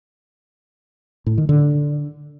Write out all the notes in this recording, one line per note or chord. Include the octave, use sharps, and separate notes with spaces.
A2
D#3
D3